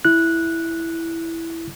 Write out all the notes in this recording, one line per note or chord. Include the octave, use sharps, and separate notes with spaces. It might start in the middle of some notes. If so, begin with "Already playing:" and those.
E4 F#6